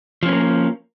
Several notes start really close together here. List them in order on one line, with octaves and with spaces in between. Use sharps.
F3 C#4 B3 A#3